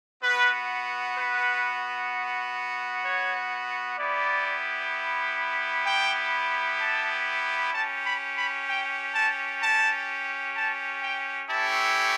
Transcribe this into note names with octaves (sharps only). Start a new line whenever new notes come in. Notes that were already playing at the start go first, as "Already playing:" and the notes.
B3 F#4 B4
B4
C#5
B3 E4 G4 D5
G5
A5
C#4 G4 A5
B5
B5
G5
A5
A5
A5
G5
A3 C#4 E4 G4 A5